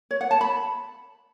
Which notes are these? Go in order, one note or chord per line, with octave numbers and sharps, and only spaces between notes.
C#5
F#5
A5
B5